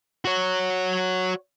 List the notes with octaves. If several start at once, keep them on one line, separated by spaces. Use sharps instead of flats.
F#4 C#5